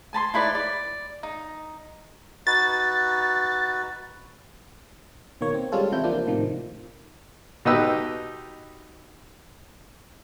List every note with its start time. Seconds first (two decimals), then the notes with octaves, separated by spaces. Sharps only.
0.13 G#5 A5 B5 C6
0.34 D#4 E4 B4 D5
0.55 D5
1.23 D#4
2.47 D#4 F#4 B4 A6
5.41 B2 D#3 A#3 C#5
5.54 C4
5.72 G3 G#3 C#4 F4 A4
5.92 C3 E3 E4 F4 G6
6.04 F3 A#3 D4
6.26 A2 C3 D#3 F3
7.65 B2 D#4 G4 B4 E6